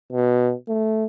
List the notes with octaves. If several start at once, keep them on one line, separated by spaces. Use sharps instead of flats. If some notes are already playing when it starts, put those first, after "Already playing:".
B2
A3